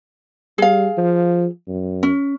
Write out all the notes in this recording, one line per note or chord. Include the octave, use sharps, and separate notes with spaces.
G3 G#4 F5
F3
F#2
C#4